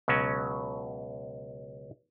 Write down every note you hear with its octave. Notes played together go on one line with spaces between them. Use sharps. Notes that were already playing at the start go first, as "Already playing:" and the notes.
C#2 B2 F#3 C#4